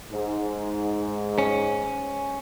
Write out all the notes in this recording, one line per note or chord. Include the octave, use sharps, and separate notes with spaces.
G#2
C#4